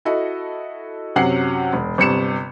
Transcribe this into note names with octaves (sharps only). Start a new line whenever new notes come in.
E4 F#4 A4 D#5
F#2 C3 F#3 C#4 F#5 C7
E1
G1 C3 C#7 E7